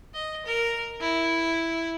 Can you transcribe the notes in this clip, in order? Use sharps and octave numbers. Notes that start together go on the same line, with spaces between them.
D#5
A#4
E4